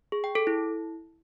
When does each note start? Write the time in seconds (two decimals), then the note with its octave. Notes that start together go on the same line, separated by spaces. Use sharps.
0.12 G#4
0.24 G5
0.35 A4
0.47 E4